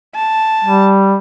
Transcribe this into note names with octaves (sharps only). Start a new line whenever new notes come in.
A5
G3